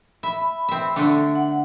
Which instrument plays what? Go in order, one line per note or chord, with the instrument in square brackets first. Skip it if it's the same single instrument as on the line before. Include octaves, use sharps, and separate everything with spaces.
[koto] E5 [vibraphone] B5
[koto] C4 E5
D3 A3 D4
[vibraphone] F#5